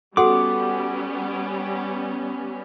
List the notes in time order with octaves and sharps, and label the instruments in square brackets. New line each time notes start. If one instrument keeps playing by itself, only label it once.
[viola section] G3 B3 C#4 [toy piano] F#4 A4 C6 [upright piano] F#5 [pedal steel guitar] D6